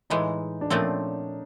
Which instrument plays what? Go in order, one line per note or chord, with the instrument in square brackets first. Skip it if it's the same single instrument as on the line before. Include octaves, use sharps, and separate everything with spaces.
[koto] A2 E3 G#3 [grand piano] D#4
[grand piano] D4
[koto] A#2 F3 A3 C4 [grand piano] C#4